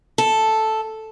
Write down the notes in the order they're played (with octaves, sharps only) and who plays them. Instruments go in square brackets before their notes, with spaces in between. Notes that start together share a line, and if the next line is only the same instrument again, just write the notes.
[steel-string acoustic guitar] A4